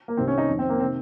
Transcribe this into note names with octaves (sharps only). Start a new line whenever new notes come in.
A#3
C2 C3 D#3 C4
C#4
D#4
F2 D#3
C4
A#3
C3 D#3 C4